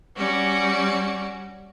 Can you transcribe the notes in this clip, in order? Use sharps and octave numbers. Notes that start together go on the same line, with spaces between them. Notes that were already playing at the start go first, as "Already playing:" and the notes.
G3 C#4 F#4 D5